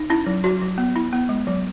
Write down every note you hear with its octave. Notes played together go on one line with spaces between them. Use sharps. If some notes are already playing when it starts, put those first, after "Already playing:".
Already playing: D#4
C#4 E4
F#3
F#3 F#4
F#3
B3
E4
B3
G#3
F#3